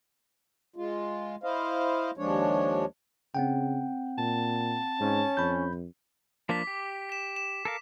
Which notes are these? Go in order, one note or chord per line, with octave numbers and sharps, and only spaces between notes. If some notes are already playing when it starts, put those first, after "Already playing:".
G#3 F4
E4 C5 D#5 F5
D#2 F3 G#3 D4 C#5
C#3 C4 F#5 G5
A#2 A5
G#2 C#4
F2 B5 G6
F3 A#3 D4 D6 B6
G4
B6 E7
E7
A4 A#4 F5